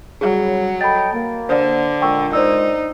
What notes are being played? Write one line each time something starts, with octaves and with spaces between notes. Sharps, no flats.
C#3 F#3 G3 G#4
A4 D#5 G5 B5 A6
A#3
D3 C5 D5
A#2 G#3 G5 C#6 E6
D#4 C5 D5 E6